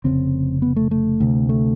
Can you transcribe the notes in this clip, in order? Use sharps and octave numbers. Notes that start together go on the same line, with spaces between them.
F1 D#2 C#3 C4
B3
A3
A3
D2 C3
A3